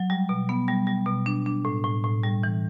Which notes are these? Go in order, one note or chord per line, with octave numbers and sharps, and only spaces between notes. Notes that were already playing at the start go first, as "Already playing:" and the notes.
Already playing: F#3
G3
B2
B3
G3
G3
B2
D4
D4
A2
A2
A2
G3
E3